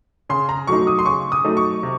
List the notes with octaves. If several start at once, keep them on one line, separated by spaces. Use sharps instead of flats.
C#3 C6
A#5
F#3 A3 D#4 C#6
D#6
C6
C#3 C#6
D#6
F#3 A3 D#4
C#6
C3